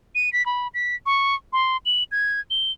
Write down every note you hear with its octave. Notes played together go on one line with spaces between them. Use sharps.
D#7
B6
B5
B6
C#6
C6
F#7
G#6
G7